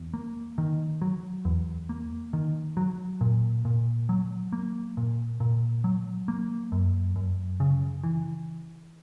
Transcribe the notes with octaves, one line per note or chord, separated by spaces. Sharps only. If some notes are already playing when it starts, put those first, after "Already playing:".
Already playing: E2
A#3
D#3
F#3
E2
A#3
D#3
F#3
A#2
A#2
F#3
A#3
A#2
A#2
F#3
A#3
F#2
F#2
C#3
E3